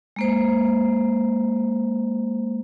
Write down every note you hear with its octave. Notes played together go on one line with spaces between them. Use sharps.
G#3 A#3 C5